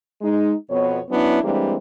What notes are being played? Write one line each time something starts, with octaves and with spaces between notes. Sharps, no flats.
G#3 D#4
F2 B2 B3 C#5
F#3 B3 C#4 D4 E4
E3 G3 G#3 A#3 C4 D4